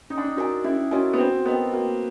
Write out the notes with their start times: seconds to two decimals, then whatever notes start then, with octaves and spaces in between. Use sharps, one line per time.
0.10 C#4 D#4
0.18 D4
0.24 D#4
0.37 D#4 F#4 A#4 D#5 G#5
0.64 C#4 E4
0.91 C#4 F#4 A#4 D#5 G#5
1.13 B3
1.18 C4 F#4
1.45 B3 A#4 D#5 G5
1.73 A#3 F#4